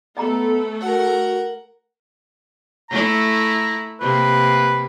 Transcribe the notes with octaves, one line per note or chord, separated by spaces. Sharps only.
A3 B3 A4 D#5 G5 A#5
F#4 A#4 F#5
A3 E4 A#5
C3 A#3 B4